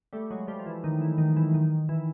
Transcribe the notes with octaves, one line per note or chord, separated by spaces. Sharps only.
G3 A3
F#3 G#3
F3 G3
F3
E3
D#3
E3
D#3
E3
D#3
E3